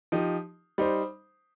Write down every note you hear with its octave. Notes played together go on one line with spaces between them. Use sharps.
F3 D#4 G4
G3 D#4 C5